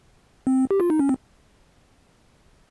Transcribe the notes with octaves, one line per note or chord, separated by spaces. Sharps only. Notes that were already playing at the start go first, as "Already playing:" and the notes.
C4
G4
F4
D#4
C#4
C4